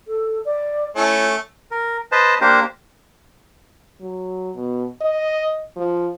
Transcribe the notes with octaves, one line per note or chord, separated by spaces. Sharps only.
A4
D5
A3 C#4 E4
A#4
B4 C5 D#5 A5
A#3 D4 G4 A#4 C5
F#3
B2
D#5
F3